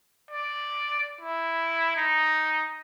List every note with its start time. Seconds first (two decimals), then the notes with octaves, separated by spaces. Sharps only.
0.31 D5
1.21 E4
1.97 D#4